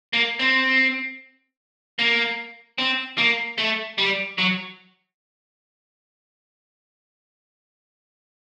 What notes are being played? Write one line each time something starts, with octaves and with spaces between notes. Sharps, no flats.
A#3
C4
A#3
C4
A#3
A3
G3
F#3